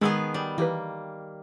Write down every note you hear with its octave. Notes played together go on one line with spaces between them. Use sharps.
D#3 G#3 B3 G#4 G#5 E6
G3
E3 A#3 G4 B4